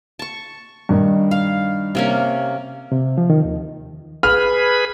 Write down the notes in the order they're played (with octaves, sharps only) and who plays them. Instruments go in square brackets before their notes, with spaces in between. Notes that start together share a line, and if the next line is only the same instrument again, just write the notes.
[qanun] A5 C#6
[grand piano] G2 D#3 D#4
[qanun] F5
C3 A#3 C#4
[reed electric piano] C3
F3
D#3
D#2
[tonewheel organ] G#4 B4 B5 [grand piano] F6